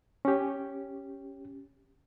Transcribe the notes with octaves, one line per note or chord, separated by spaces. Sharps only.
C#4 G4